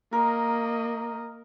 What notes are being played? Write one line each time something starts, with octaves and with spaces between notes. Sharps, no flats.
A#3 A#4 D#5